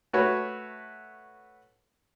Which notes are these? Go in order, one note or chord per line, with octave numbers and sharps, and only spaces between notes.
A3 F#4 B4 C#5